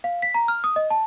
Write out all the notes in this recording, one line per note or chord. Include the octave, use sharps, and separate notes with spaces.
F5
B6
A#5
F6
D#6
D#5
A5